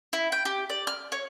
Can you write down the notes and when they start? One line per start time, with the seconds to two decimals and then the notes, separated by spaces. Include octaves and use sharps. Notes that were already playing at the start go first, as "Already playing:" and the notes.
0.13 E4
0.32 G5
0.45 G4
0.70 D5
0.87 F6
1.12 C#5